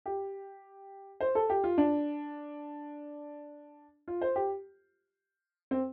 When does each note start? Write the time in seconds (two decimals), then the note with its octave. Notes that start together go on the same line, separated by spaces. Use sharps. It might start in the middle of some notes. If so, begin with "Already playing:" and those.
0.06 G4
1.20 C5
1.35 A4
1.50 G4
1.64 F4
1.78 D4
4.08 F4
4.21 C5
4.36 G4
5.71 C4